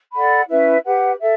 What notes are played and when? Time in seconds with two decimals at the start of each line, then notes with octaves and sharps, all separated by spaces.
0.13 A4 D5 F#5 B5
0.48 C#4 E4 B4 E5
0.84 G4 B4 F#5
1.19 A4 E5